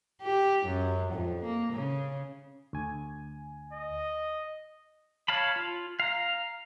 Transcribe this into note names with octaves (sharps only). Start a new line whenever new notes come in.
G4
F#2
F2
A#3
C#3
D2 G#5
D#5
C#5 F5 A5 B5
F4
F5 A#5